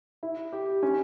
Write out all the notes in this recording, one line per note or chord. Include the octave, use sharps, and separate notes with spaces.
E4
G4
C#4